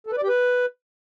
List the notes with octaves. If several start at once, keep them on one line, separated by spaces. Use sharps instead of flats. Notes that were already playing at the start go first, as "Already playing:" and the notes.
A4
B4
D5
G4
B4